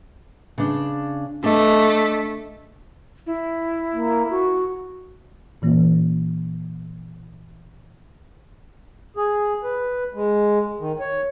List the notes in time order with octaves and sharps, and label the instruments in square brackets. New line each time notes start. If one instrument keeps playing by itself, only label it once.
[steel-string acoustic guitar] C#3 D4
[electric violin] A3 [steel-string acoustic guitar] D4 D#5
[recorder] E4
[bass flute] A#3
F#4
[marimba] A#2 E3 A#3 C#4 F4
[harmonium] G#4
B4
G#3
D#3
C#5